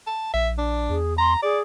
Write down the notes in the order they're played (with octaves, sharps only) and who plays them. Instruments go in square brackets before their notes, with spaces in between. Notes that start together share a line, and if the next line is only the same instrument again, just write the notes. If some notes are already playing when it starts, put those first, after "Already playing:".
[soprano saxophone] A5
[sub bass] A#1 [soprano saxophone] E5
[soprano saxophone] D4
[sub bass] E2 [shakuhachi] G#4
[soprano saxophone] A#5 [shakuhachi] C6
[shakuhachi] G#4 [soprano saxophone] D5